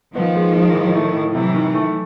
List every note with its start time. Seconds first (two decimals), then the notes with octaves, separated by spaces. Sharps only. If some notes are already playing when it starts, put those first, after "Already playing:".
0.15 D#3 F3 B3
0.36 G#3
0.56 G#3
0.75 A2
0.96 A3
1.15 A2
1.35 C3 E3 F#3
1.54 D#3
1.74 A3